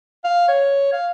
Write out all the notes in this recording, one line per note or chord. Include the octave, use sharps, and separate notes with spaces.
F5
C#5
F5